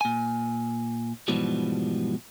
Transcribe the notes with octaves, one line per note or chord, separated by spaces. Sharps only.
A#2 G#5
G#2 B2 E3 F3 G3